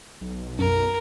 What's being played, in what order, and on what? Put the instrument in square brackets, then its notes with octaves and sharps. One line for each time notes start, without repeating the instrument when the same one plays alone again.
[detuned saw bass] B1
[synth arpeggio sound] F#2 [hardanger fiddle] A#4